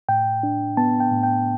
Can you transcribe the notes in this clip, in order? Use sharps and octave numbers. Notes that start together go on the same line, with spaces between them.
A2 G5
D4
B3 A5
G5
A2
G5